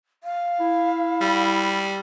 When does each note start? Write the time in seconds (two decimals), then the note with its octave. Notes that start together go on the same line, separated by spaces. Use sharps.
0.24 F5
0.60 E4
1.21 G3